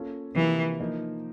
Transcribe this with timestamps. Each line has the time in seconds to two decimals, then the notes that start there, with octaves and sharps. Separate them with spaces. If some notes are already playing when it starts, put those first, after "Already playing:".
Already playing: A#3 C#4 F4 A4
0.35 C3 E3 F3 A#3
0.80 F3 A#3 D#4